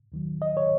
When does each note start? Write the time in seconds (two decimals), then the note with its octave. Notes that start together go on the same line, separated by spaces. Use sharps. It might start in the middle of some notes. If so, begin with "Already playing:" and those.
0.12 D#2 D#3 F#3
0.42 D#5
0.57 C#5